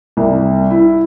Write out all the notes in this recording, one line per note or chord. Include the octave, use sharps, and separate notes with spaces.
C2
E4